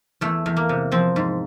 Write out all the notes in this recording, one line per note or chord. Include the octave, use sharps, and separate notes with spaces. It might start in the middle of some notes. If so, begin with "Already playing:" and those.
E2 A3
E2
A#3
C3
F3 C4
G#2